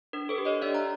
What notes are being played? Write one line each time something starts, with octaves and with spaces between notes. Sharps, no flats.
D4 A#4
A4 B4
G4
C#5 D#5
D4 D5 E5
A#5